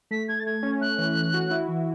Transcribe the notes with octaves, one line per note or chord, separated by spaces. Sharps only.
A3 B6
A3 G#6
A6
A3 G#6
C#4
A3 F#6
E3
E3
F#4
E4
E3